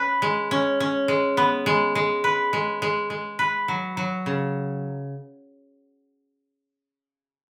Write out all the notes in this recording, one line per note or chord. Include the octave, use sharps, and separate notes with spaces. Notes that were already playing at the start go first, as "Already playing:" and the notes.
Already playing: C#4 B4
G#3
C#4
C#4
G#3
B3
G#3
G#3
B4
G#3
G#3
G#3
B4
F#3
F#3
C#3